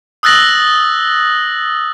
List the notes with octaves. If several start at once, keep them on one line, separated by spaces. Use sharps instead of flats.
D#6 E6 F#6 A6 A#6 F#7